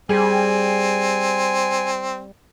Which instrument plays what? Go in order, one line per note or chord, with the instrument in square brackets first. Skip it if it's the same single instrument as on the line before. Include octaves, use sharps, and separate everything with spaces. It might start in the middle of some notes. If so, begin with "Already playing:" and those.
[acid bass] G3 [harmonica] C4 [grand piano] G#4 [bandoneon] G#5